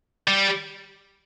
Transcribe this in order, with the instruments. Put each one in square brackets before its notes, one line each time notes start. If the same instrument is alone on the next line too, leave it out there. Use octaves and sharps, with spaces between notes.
[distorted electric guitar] G3